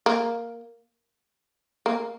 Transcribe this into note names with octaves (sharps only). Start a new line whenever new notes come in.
A#3
A#3